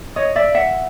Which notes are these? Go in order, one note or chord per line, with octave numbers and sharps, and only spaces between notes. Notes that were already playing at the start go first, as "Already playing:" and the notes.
C#5 D#5
D5 E5
E5 F#5